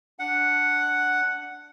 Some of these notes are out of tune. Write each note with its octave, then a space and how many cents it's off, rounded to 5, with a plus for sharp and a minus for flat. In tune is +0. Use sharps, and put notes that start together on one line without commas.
D4 +0 F#5 +0